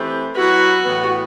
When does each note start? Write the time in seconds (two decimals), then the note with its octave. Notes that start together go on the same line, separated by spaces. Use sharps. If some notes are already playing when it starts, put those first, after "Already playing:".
Already playing: E3 A3 C4 G4 B4
0.35 F#3 B3 E4 F#4 B4
0.85 A2 E3 B3